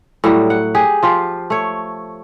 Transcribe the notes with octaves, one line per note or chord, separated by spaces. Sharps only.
A2 F#3 G3
F#5
G4 G#4
F3 F4 G4
A3 C#5